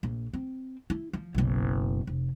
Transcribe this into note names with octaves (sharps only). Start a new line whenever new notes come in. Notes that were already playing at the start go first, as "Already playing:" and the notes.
A#1
C4
E4
F3
F#1 B1
F1